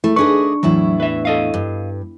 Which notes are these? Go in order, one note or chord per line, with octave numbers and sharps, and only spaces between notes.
A3 E4
D4 D#4 G#4 B4 D5 C#6
E2 A2 F#3 E4
B4 E5
A4 D#5 F5
G2